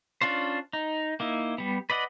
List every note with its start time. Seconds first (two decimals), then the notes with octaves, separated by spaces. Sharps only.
0.21 C#4 D4 F4 C5
0.73 D#4
1.20 A#3 D#4 E4
1.58 G3 B3
1.90 B4 D5 D#5 F#5